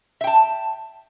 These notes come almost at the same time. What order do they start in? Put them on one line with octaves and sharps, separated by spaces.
E5 G5 A5